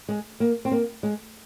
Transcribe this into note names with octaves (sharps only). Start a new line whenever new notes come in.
G#3
A#3
C4
A#3
G#3